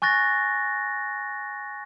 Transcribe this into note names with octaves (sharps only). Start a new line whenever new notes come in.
G#5 C#6 F#6 A6 A#6